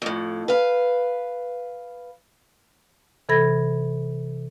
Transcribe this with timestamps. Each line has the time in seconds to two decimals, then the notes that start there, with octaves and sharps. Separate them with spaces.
0.02 F2 A2
0.48 B4 F5
3.29 C3 E3 A4 B5 G#6 A#6